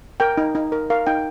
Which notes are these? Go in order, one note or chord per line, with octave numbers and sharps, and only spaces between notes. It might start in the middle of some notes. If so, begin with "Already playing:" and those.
A#4 G5
D#4
D#4
A#4
A#4 F5
D#4 G5